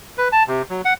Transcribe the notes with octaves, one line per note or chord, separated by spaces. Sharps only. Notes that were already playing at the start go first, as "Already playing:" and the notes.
B4
A5
C3
F#3
F#5